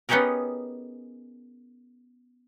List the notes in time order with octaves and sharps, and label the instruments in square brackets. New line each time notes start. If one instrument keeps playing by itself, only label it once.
[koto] B3 C#4 D#4 G4 G#4 A#4